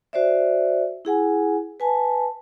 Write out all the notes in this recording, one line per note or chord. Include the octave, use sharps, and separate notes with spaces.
F#4 C5 D5 E5
E4 G#4 F#5 G#5
B4 G#5 A5